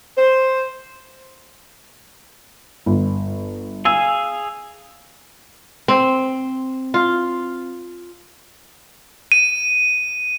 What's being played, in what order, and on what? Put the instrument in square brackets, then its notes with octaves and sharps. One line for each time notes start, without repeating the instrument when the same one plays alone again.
[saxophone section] C5
[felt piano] G1
[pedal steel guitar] G#4 F5 G#5 [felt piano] E6
[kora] C4
F4
[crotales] D#7